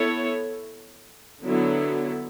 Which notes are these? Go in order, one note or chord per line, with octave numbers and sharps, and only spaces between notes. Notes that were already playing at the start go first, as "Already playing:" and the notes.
Already playing: B3 E4 A4 C#5
D3 F#3 B3 E4